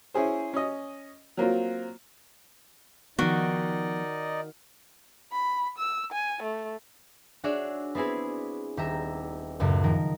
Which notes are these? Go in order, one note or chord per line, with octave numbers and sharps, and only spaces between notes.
C#4 E4 G#4 C5
C#4 D#5
F#3 A#3 C4 F4
D#3 F3 B3 D#4 F#4 D5 D#5
B5
E6
G#5
A3
D4 F#4 G#4 C#5 D5 E5
B3 C4 E4 G#4 B4
D#1 G4 E5 A#5
C#2 F#2 A2
D#3 F3 A#4